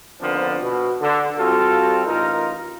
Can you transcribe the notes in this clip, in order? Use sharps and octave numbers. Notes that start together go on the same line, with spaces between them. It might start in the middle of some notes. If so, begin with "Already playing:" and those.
D3 D#3 F3 B3 C4 D4
B2
D3
G3 C4 F4 F#4 A4
A1 D#4 F4 A#4